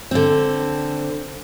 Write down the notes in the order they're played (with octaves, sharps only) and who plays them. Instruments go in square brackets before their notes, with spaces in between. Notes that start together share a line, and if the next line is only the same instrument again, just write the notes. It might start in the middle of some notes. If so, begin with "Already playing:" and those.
[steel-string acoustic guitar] D3 C4